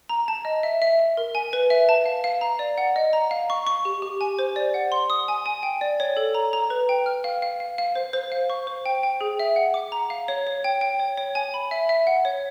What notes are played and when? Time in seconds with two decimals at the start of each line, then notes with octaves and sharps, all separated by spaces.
0.09 A#5
0.28 A5
0.45 D#5
0.63 E5
0.82 E5
0.99 E5
1.17 A#4
1.35 G#5
1.53 B4
1.70 E5
1.89 A5
2.06 F5
2.24 F5
2.41 A#5
2.59 D5
2.78 F#5
2.96 D#5
3.13 A#5
3.31 F5
3.50 C#6
3.67 C#6
3.85 G4
4.02 G4
4.21 G#5
4.39 C5
4.56 D5
4.74 F#5
4.92 C6
5.10 D#6
5.28 G#5
5.46 G#5
5.63 G5
5.81 D5
6.00 C#5
6.17 A4
6.35 A#5
6.53 A#5
6.70 B4
6.89 G5
7.06 F6
7.24 F5
7.42 F5
7.60 F5
7.78 F5
7.95 C5
8.13 C5
8.32 F5
8.50 C#6
8.67 C5
8.86 G5
9.03 G5
9.21 G#4
9.39 E5
9.56 F#5
9.74 D6
9.92 A#5
10.10 F5
10.28 C#5
10.47 C#5
10.64 G5
10.81 G5
11.00 C#5
11.17 C#5
11.35 G#5
11.54 B5
11.71 E5
11.89 E5
12.07 F#5
12.25 C#5